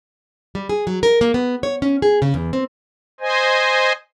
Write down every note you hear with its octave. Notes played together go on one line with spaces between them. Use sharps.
G3
G#4
F#3
A#4
A#3
B3
C#5
C#4
G#4
C#3
E2
C4
C5 D#5 G#5